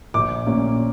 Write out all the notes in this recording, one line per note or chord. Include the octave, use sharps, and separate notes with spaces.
A#1 D6
A#2 A#3 C#4